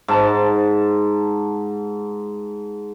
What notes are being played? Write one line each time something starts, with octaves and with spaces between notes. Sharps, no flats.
G#2 A5